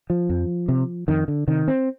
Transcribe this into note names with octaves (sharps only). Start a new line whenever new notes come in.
F3
F2
C3
F2 D#3
D3
C3 D#3
C4